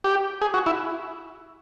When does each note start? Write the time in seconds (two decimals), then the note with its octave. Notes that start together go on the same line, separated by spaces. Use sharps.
0.04 G4
0.42 G#4
0.54 F#4
0.66 E4